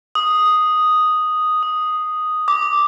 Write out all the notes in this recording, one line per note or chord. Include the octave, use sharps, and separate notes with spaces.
D#6
D#6
D6